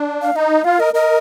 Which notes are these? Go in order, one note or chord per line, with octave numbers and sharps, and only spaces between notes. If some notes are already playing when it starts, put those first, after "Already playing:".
Already playing: D4
F5
D#4 D#5
F4 F5
A#4 D#5
A#4 D#5